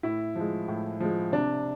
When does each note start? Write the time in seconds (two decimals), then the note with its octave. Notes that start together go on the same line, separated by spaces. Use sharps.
0.03 A2 E4
0.36 F3 G#3
0.68 A2
1.00 F3 G#3
1.32 C3 D4